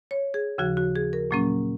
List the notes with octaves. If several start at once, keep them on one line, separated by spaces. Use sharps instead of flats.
C#5
G#4
D#2 C#3 F3 F#4
F#4
G#4
A#4
A#2 F#3 A#3 C#4